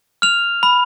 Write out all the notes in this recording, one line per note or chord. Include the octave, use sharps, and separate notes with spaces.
F6 F7
B5